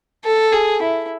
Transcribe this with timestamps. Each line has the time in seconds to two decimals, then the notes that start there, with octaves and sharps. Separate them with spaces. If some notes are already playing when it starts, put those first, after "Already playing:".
0.25 A4
0.52 G#4
0.82 E4